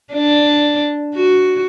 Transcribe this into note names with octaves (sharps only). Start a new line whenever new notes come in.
D4
F#4